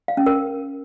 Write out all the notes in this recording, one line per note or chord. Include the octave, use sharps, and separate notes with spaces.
F5
C#4
A#4